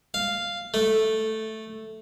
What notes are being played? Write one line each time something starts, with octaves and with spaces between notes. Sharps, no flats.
F5
A3